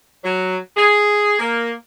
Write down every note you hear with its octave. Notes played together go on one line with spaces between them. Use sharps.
F#3
G#4
A#3